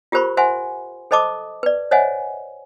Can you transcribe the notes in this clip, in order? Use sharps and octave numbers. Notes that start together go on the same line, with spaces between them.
F4 G4 A#4 C5 B5 C#6
C5 E5 F#5 G#5 C6
A4 C5 D#5 A5 D6 D#6
B4 D5
C5 C#5 D#5 E5 F#5 G#5